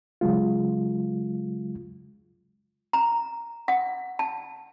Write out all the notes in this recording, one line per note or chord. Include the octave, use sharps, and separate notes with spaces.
C#3 F#3 G#3 F4
A#5
F#5
A5